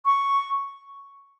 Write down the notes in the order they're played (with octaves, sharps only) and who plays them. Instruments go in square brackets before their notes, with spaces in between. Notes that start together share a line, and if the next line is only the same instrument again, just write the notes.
[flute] C#6